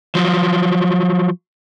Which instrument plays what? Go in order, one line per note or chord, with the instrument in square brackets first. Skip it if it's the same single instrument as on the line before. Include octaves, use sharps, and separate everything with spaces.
[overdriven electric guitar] F3 F#3